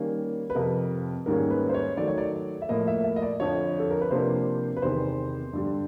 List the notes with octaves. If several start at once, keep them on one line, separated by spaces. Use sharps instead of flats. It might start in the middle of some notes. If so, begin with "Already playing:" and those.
Already playing: D#3 G3 A#3 C#4
B4
F2 C3 F3 A#4
G#2 D#3 G3 A#3 C#4 A#4
B4
C5
C#5
D#3 F#3 A3 D5
C#5
D5
E5
A2 F3 A#3 D#5
E5
E5
D#5
D5
F2 D3 F3 C#5
A4
A#4
B4
C3 F3 A#3 D4 C5
B4
E2 C3 D#3 C5
G2 D3 G3